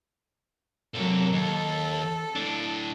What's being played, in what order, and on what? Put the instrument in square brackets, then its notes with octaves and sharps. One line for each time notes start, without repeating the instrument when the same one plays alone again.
[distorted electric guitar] C3 A4 [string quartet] F#3 A#3
[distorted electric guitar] D#2 [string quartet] A4
[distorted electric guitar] A2 D4